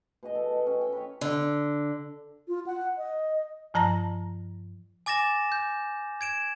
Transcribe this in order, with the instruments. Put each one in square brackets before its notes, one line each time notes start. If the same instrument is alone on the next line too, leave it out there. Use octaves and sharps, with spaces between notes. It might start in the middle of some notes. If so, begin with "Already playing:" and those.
[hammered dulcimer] B2 G#4 D#5
A4
A4 G5
C#4
G5
B4 C#5
[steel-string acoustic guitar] D3
[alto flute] F4
F#5
D#5
[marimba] G2 F3 A5 A#5 A#6
[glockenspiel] G#5 D6 A6 A#6 E7
G6
G#6 D7 E7